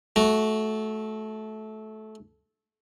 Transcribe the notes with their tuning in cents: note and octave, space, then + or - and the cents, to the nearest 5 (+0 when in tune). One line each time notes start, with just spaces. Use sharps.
A3 -20 F#4 +0